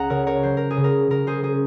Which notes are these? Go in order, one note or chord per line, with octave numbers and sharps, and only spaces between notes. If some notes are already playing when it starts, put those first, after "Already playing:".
Already playing: C#2 F#5 A#5
C#3 A#4 C#5
A#4 C#5
F#3 C5
A#4
G#4
C#3
A#4
C#3 A#4
G#4 C5
C#4 G#4